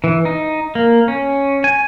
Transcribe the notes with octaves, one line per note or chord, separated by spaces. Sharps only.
E3
D#4
A#3
C#4
G#5